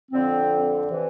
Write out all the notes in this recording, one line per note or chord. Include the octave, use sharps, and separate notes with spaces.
F2 D3 C4
C3 E3